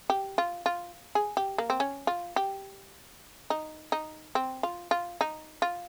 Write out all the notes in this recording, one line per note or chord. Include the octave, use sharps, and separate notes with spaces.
G4
F4
F4
G#4
G4
A#3
C4
C#4
F4
G4
D#4
D#4
C4
F4
F4
D#4
F4